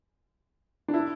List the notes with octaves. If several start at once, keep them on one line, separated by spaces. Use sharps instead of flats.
D4
E4